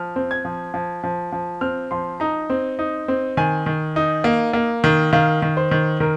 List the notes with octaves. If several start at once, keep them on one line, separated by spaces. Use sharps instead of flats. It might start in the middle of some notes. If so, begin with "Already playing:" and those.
Already playing: F3 F6
C4
G#6
F3
F3
F3
F3
C4 F6
F3 C6
D#4 A#5
C4
D#4
C4
D#3 G#5
D#3
D#4
A#3
A#3
D#3
D#3 F5
D#3
C5
D#3
D#3 A#4